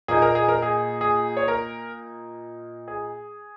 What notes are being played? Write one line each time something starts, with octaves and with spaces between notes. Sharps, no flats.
A#2 A#3 D#4 G#4
A#4
G#4
A#4
G#4
G#4
C#5
A#4
G#4